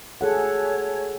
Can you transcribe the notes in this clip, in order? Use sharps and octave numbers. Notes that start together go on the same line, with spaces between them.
G#4 A4 C#5 F#5